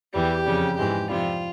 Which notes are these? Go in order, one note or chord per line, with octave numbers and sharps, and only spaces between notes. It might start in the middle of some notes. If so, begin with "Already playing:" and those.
E2 E3 G3 G4
F2 C#3 G3
G#2 E3 G#3 G4
F2 C3 G3 F4